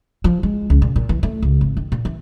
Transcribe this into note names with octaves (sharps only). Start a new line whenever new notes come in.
F3
G#3
C#2
A#2
A#2
E3
A3
C#2
G#1
D#3
A#2
E3